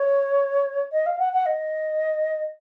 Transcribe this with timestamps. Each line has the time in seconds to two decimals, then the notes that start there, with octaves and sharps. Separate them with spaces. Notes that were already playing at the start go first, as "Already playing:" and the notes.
Already playing: C#5
0.92 D#5
1.06 F5
1.18 F#5
1.33 F#5
1.46 D#5